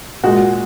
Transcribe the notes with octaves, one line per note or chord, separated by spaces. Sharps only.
A#2 G#3 F#4